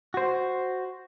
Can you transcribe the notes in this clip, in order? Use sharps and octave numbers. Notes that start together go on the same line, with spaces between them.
F#4 C5